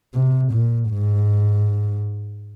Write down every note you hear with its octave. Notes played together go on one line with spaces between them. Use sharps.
C3
A#2
G#2